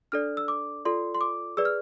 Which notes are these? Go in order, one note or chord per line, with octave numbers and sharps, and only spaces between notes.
D4 A4 D5 F6
E6
D6
F4 A4 D5 C6
C6
D6
G#4 B4 D5 E6
F6